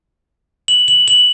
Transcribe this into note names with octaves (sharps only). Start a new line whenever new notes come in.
F#7
F#7
F#7